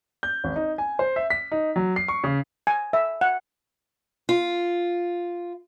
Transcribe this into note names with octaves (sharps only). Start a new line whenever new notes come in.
G6
G#1
D#4
G#5
C5
E5
B6
D#4
F#3
C7
C#6
C#3
G#5
E5
F#5
F4